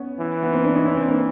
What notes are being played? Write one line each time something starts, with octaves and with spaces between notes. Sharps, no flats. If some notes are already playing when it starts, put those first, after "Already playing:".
Already playing: B3 C#4
E3
B3
A#3 C4
C4 D4
C#4 D#4
C4 D4
C4 D4
A#3 C4